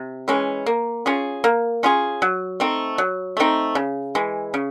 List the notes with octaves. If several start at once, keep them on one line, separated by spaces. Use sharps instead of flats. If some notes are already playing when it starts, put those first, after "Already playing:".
Already playing: C3
E3 G#3 C#4
A#3
C#4 F4 G#4
A#3
C#4 F4 G#4
F#3
A3 C4 D#4
F#3
A3 C4 D#4
C#3
E3 G#3
C#3